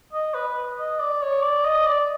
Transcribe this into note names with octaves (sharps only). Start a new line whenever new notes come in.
D#5
B4
D#5
D5
C#5
D5
D#5
D5